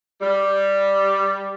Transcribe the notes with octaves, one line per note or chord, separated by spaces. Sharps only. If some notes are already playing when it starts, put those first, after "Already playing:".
G3